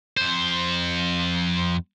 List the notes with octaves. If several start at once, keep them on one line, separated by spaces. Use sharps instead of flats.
F2 C5